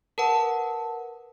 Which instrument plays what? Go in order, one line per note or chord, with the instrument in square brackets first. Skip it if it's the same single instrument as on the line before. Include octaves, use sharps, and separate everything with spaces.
[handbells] A#4 B4 F#5 [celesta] A5